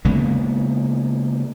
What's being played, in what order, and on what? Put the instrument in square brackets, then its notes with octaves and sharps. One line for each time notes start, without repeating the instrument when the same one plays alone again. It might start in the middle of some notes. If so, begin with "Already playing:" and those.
[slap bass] C#3 G#3 A#3 B3